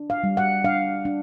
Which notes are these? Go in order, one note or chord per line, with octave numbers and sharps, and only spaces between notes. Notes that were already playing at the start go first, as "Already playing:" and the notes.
Already playing: D4
F5
G3
F#5
D4 F5
D4